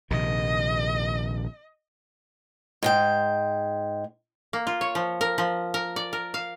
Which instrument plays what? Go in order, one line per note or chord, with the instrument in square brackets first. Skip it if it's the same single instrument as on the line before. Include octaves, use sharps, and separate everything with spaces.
[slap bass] A#1 C3 D#3 [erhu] D#5
[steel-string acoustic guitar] G#2 G#3 G5
[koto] A#3
F4
C#5
F3
A#4
F3
A#4
D5
A#4
F5